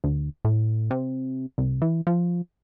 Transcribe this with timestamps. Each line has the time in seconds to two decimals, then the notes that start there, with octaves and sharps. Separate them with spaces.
0.04 D2
0.45 A2
0.91 C3
1.58 C2
1.82 E3
2.07 F3